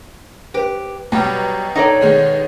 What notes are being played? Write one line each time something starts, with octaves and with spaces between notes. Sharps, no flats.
G4 B4
B2 F#3 G3 G5 A#5
D#4 A4 C#5 D5 F#5
B2 D#3 G#3